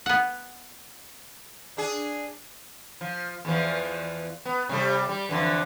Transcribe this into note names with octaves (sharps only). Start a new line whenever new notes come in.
B3 F#5
D4 G#4
F3
E2 E3 F3
B3
C3 G3 A4
G3
F2 D3 E3